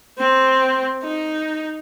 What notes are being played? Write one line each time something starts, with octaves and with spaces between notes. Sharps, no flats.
C4
D#4